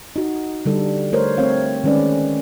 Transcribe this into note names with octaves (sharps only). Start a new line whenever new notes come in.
D#4 F#4
D3 G3 A4
A3 A#4 C5 C#5
A3 C4 C#5 F5
D#3 G#3 C#4 B4 D5